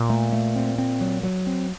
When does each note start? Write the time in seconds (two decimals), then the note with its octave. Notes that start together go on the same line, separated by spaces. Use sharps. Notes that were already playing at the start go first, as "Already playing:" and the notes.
Already playing: A#2
0.10 A3
0.32 A3
0.56 C4
0.78 C4
1.01 F#3
1.23 F#3
1.47 C4